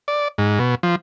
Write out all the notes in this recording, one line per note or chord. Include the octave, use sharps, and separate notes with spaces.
D5
G#2
B2
F3